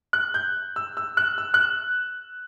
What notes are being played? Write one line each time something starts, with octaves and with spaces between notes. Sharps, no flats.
F#6
G6
E6
E6
F#6
E6
F#6